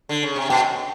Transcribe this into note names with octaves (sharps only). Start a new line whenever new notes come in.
D3
C#3
C3
B2 G5